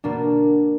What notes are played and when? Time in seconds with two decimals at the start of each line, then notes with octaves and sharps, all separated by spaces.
0.04 B2 A#3 D4